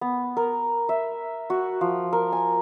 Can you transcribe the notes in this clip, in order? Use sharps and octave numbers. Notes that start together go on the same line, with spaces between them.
B3
A#4
E5
F#4
F3
A#4
G#5